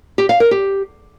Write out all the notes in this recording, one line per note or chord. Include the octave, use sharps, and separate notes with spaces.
G4
F5
A#4
G4